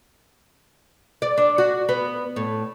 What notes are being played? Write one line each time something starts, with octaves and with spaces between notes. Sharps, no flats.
D5
D4
F#4
B3
A2